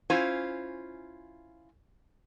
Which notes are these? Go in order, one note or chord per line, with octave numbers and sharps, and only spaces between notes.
C#4 E4 F4 C5 G#5